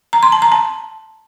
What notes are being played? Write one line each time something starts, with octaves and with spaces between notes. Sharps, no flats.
A#5
C6
A5
A#5
A5